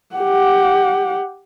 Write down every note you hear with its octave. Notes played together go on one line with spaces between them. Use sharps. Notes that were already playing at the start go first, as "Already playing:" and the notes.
G4 F#5